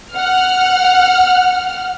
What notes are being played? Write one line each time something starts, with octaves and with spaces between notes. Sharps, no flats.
F#5 F6